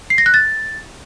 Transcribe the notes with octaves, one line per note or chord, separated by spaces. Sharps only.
C7
A#6
F#6
A6